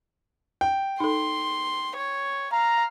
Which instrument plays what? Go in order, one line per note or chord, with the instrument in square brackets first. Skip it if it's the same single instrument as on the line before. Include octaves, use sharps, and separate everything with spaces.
[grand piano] G5
[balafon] D#4 A4 [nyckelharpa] C6
[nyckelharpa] C#5
[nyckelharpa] F5 [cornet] A#5